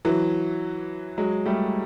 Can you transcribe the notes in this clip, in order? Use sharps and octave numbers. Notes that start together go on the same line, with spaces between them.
E3 F#3
F#3 G#3
G3 A3